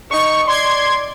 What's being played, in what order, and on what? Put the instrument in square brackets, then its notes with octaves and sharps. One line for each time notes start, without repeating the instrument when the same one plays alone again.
[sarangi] D#4 [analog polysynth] C#6
[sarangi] D5 [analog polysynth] C6 G#6